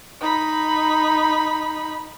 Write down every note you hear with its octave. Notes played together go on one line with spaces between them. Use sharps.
D#4 B5